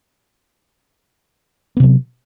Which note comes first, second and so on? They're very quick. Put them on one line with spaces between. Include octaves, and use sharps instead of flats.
B3 C3 F#3